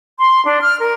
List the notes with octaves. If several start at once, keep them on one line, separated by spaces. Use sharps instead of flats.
C6
D4
F6
A#4